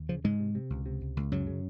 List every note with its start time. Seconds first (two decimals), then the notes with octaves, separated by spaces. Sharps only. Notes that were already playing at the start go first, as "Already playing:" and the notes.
Already playing: D#2
0.09 C#3 F3
0.24 G#2 C#3 G#3
0.40 C3
0.55 C3
0.70 C#2
0.86 C3
1.01 C#2
1.17 C#2
1.32 F#2 C#3 F#3
1.47 C#3